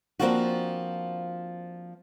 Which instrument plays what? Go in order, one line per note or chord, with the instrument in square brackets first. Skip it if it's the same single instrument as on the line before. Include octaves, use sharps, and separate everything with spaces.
[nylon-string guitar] F3 A#3 C4 D4 F4 F#4